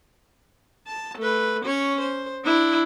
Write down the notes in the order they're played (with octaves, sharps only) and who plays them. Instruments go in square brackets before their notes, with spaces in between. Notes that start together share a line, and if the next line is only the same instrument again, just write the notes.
[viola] A5
A3 B4
C#4 C#5
C5
D4 E4